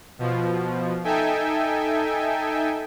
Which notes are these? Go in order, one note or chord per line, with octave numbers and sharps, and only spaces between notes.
B2 F3
D#4 A4 E5 G5 G#5